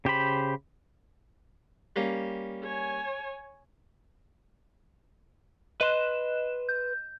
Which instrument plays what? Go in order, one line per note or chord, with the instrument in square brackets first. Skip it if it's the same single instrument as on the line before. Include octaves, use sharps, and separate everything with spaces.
[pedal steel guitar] C#3 G4 C5 B5
[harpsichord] G3 A#3 C#4
[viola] C#5 G#5
[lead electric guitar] B4 C6 [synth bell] D#5 F#6 E7
[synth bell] G6